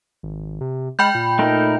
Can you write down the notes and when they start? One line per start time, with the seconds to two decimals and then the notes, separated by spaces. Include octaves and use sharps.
0.23 G#1
0.61 C3
0.99 G#3 G5 B5 G6
1.15 A#2
1.39 A3 D#4 A#4